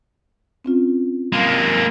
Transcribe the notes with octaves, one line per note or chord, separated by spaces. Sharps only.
C4 C#4 F4
G#3 A#3